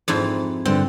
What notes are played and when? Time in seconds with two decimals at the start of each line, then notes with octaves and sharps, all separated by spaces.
0.08 F2 G#2 E4
0.65 G2 D3 C4